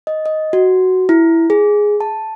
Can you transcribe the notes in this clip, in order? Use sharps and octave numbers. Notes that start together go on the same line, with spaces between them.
D#5
D#5
F#4
E4
G#4
A5